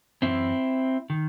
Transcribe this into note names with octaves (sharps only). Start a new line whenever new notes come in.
F#2 E3 C4 E4
D#3